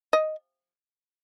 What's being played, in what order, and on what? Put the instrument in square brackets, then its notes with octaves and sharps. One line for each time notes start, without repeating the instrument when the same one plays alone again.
[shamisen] D#5